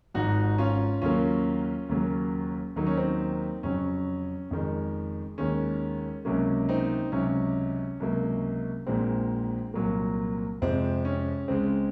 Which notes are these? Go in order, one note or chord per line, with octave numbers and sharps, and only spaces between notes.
G#1 G#2 F3 D#4 F#4
C#4 F4
D#2 C#3 F#3 A#3 C#4 F4
D#2 C#3 F#3 A#3
D#2 D#3 F#3 A#3 D#4
C#4
C4 D#4
F2 C#3 F#3 C#4
F2 D#3 G#3
D#2 D#3 G#3 C#4
C#2 C3 F#3 A#3 C#4
C4 D#4
C#2 C3 F#3 C#4
C#2 C3 F#3 A#3
A#1 A#2 G#3 C4
C2 A#2 F#3 A#3
F2 C3 F3 G#3 C4
C#4
C#2 C#3 G#3 C4